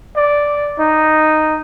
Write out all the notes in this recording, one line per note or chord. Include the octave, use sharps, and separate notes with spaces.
D5
D#4